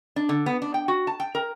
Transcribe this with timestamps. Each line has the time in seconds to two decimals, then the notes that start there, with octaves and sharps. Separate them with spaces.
0.16 D4
0.29 D3
0.46 B3
0.62 D4
0.74 G5
0.88 F#4
1.07 A5
1.20 G5
1.35 A#4